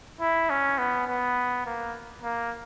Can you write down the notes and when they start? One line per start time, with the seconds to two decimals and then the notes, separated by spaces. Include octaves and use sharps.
0.21 E4
0.50 C#4
0.78 B3
1.08 B3
1.65 A#3
2.24 A#3